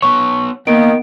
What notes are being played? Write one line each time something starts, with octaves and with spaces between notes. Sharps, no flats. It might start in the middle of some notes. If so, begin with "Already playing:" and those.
B3 B4 C#5 C#6
D#3 A#3 B3 D7